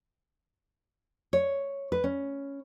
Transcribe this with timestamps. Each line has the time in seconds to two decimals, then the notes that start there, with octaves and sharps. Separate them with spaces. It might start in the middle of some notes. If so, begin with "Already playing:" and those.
1.33 C#5
1.92 B4
2.04 C#4